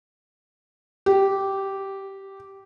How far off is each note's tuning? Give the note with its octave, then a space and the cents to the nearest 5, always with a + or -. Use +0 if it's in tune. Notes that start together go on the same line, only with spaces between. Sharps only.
G4 -10